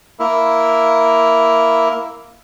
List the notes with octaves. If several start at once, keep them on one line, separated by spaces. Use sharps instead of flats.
A#3 E4